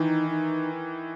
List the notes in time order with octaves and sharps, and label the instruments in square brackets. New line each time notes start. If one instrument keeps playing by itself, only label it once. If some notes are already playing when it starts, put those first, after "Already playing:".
Already playing: [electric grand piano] D#3 E3 [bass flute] D#4
[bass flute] D#4